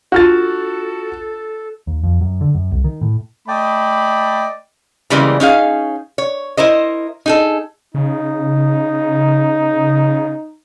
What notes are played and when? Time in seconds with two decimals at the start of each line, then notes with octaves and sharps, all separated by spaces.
0.12 D4 F4 F#4 A4 A5 F6 A6
1.87 D#2
2.03 F2
2.21 F#2
2.41 D3
2.55 F#2
2.71 C2
2.84 D#3
3.01 A2
3.48 A3 D5 D#5 G5 B5
5.10 C#3 E3 G3 G#3 A#3 C4
5.40 C#4 D#4 G#4 F5
6.18 C#5
6.57 E4 A#4 C5 D#5
7.26 D#4 G#4 A4
7.94 C#3 D#4